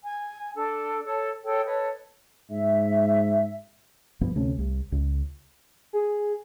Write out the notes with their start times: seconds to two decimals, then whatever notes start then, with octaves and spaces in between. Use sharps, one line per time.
0.05 G#5
0.56 D4 A4
1.05 A4 C#5 A5
1.44 G#4 A4 C#5 G5
1.65 A4 B4 C#5 D#5
2.51 G#2 E5
4.21 F1 G2 F3 B3
4.35 D2 C3 A3 C#4
4.58 C2
4.92 C#2
5.93 G#4